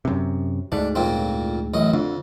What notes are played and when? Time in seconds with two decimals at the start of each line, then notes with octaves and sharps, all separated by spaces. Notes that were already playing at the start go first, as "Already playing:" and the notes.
0.05 F#2 C3
0.72 D2 G#2 D4
0.95 F2 A#2 C4
1.74 A1 F#2 D#5
1.94 F2 D3